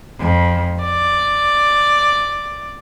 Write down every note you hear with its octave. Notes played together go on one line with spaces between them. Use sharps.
F2
D5